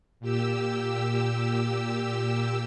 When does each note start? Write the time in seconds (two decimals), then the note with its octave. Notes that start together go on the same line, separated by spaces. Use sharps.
0.20 A#2 G4 E6